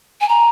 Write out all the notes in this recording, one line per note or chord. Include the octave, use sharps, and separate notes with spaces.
G#5
A#5